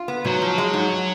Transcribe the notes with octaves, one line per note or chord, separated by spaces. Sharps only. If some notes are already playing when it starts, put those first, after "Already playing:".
Already playing: F4
B3
G#2 F#3
F3
G#3
G#2